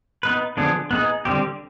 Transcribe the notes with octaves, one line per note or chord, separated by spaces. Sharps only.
B3 D#4 B4
D3 F3 B3 D4 G#4
B3 D#4 G#4
D3 G3 C4 G4